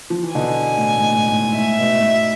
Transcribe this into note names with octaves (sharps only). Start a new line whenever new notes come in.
F3
E3
B2 D3 G#5
A2
G#2
A2
G#2
G#2
A2 E5
G#2 B2
G#2 B2